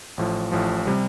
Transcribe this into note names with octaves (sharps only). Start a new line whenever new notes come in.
A1 A2 F3
A1 A2 F3
C3 G3